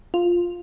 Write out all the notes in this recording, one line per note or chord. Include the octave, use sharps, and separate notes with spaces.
F4